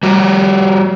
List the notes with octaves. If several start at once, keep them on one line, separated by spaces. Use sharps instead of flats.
G3 F#4 G4